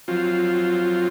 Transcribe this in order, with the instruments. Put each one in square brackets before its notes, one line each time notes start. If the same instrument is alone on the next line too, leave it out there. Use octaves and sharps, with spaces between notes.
[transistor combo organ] F3 F#3 C4 F4